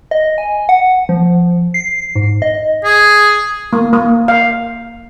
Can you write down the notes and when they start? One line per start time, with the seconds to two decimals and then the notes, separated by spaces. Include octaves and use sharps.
0.11 D#5
0.38 G#5
0.69 F#5
1.09 F3
1.74 C7
2.15 G#2
2.42 D#5
2.84 G#4
3.73 A#3
3.93 A#3
4.28 F5